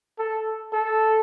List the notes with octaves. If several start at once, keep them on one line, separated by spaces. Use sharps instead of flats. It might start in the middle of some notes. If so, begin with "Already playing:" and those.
A4
A4